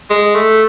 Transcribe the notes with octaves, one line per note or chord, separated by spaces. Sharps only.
G#3
A3